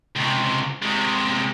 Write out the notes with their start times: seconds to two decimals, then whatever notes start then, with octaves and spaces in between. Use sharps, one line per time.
0.16 C#2 C3
0.82 C3 G#3